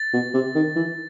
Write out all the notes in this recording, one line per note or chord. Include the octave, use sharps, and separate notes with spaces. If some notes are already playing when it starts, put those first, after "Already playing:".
Already playing: A6
B2
C3
D#3
E3